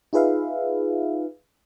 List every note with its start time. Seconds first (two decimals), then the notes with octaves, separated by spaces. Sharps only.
0.13 D#4 F4 G#4 B4 E5 F5